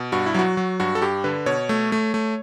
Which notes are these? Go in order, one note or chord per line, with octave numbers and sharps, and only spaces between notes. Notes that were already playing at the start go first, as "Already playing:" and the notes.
Already playing: B2
G2 F#4
E4
F#3 F#4
F#3
G2 F#4
A4
G2 G4
D3 B4
B2 C#5
A3
A3
A3